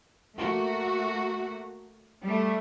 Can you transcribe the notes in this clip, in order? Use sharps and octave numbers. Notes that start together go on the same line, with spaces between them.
A3 A#3 F#4
G3 A3